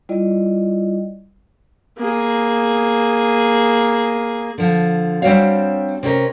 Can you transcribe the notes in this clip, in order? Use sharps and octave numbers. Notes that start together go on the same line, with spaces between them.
G3 E4 F4 D5 D#5
A#3 G#4
D3 F3
G3 C4 D4 F#4 C#5 F5
C3 C#4 A#4 D#5